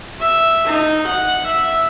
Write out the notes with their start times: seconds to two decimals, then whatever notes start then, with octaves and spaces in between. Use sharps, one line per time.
0.20 E5
0.66 D#4
1.06 F#5
1.46 E5